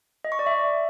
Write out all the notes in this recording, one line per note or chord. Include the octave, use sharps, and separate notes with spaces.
D#5
C#6
D5
E5